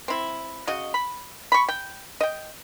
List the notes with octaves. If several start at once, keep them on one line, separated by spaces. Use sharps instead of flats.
C4 E4
C#3 F#4 D#5
B5
B5 C#6
G5
D#5 G5